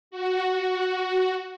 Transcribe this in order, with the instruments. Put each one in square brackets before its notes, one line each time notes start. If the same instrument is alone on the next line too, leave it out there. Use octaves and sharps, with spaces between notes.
[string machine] F#4